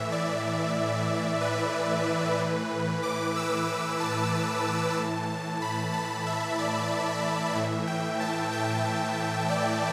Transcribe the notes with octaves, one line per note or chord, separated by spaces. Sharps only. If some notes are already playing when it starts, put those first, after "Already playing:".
Already playing: A2 E3 E5
D5
B4
A2 E3
D6
E6
D6
A5
A2 E3
B5
A5
E5
D5
A2 E3 E5
G5
A5
G5
D5